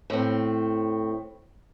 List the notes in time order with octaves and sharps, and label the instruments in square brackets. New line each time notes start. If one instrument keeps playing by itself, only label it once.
[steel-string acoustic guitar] A2 C4